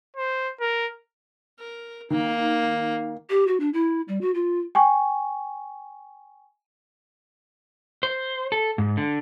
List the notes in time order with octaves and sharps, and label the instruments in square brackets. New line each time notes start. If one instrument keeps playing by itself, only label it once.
[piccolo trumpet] C5
A#4
[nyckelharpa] A#4
[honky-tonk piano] D#3 [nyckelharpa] A#3
[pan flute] G4
F#4
D4
E4
G3
F#4
F4
[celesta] G5 G#5 C#6
[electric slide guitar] C5
A4
G#2
D3